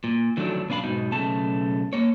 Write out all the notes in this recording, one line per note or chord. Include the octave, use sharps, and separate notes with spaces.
A#2
D3 D#3 F3 F#3 A3 D4
B1 B3 D4 F5 B5
G#2 B2 D#4
B1 C#3 A3 A5
A#3 C#5